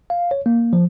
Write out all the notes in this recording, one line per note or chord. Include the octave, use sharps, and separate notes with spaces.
F5
C#5
A#3
F3